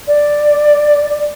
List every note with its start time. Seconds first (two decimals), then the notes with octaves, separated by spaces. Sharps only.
0.08 D5